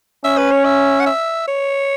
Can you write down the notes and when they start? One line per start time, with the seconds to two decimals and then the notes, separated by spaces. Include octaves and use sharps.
0.24 C#4 E5
0.38 B4
0.52 C#5
0.65 E5
1.00 F#5
1.06 E5
1.48 C#5